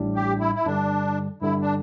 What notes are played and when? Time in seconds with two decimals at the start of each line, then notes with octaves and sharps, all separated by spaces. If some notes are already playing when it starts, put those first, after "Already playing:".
Already playing: A1 A2 G3 D4
0.15 G4
0.40 E4
0.55 E4
0.66 G2 D3 G3 D4
1.42 G2 D3 G3 E4
1.61 D4